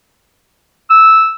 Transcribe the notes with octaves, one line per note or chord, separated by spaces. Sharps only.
E6